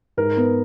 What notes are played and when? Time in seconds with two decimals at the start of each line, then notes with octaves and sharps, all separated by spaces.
0.17 G#2 A#4
0.37 B3